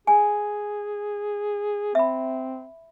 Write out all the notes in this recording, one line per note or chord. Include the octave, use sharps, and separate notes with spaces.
G#4 G#5
C4 E5 B5